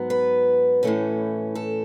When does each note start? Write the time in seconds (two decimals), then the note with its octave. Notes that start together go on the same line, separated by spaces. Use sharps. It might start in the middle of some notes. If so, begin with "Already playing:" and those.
Already playing: G#2 F#3 B3
0.10 B4
0.83 A2 E3 A3 C#4
1.55 A4